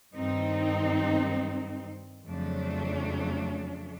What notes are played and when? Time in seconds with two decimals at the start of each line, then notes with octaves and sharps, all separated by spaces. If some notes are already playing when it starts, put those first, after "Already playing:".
0.14 G2 D#3 G3 C4 D#4
2.27 F2 C#3 F#3 A3 D4